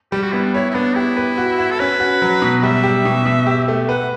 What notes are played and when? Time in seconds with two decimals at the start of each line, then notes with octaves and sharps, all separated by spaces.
0.12 G3 G4
0.23 F#4
0.33 B3 E4
0.44 D4
0.54 E4 C#5
0.71 E4
0.75 B3 D4
0.96 E4 G4
1.17 B4
1.38 F#4
1.59 F#4
1.71 A4
1.80 C#4 B4
2.00 F#4
2.22 F#3
2.42 B2
2.63 G3 E5
2.83 G4
3.05 B2
3.26 B2
3.47 G4
3.68 A3
3.89 B4 F#5